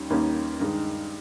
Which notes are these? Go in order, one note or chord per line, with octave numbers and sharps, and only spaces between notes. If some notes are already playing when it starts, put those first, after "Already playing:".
Already playing: D#2 D#3 G3 C#4
D#2 D#3 G3 A#3 C#4
G2 D#3 G#3